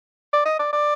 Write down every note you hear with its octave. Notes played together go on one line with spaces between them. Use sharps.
D5
D#5
D5
D5